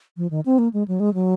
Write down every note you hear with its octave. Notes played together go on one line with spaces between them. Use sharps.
F3
D#3
C4
A#3
G#3
F#3
G#3
F#3